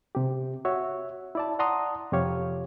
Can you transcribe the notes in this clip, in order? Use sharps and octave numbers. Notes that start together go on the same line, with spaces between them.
C3 G4
F#4 C#5 E5
E4 D5 A5
D5 F#5 A5 A#5 C6 D#6
F2 C3 G4 C#5 F5